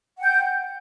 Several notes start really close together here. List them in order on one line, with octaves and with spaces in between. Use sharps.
F#5 G5 G6